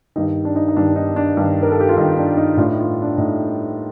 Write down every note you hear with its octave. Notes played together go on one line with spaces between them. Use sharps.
G2 D#3 D#4
D4
D#4
D#4
G2 D#3 D4
D#4
D4
G2 D#3
A#4
A4
G4
F4
G2 D#3 D#4
D4
D#4
A2 D4 F4
D#4
F4
D#4
D4
A2 D#4